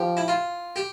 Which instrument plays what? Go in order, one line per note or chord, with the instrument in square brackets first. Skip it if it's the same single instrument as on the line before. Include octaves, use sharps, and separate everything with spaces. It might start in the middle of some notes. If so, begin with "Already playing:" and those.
Already playing: [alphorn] F3 [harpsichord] G4
[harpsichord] E4
F4
G4